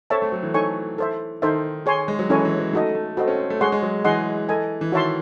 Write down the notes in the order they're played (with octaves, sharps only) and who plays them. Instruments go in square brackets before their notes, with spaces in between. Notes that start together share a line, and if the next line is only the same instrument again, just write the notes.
[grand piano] C4 [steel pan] A4 C#5 E5 A5
[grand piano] A3
F#3
E3
[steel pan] D#4 A4 C#5 G#5 C#6
A4 C5 E5
[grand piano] D#3 [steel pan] D#4 A4 C5 E5
[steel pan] G#4 C#5 G#5 C6
[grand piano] G#3
F#3
[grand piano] E3 [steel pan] C#4 E4 A4 C#5 G#5
[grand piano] E3
F#3
[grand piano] A3 [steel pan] D#4 F#4 A4 D#5
[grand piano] A3
[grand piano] C4 [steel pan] F#4 A4 D#5
[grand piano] C#4
C4
A3
[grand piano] G#3 [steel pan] G#4 C#5 F#5 C6
[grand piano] G#3
F#3
[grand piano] E3 [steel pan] G#4 D#5 F#5 C6
[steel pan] A4 D#5 G#5
[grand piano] E3
[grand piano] D#3 [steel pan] F#4 C#5 E5 A5 C6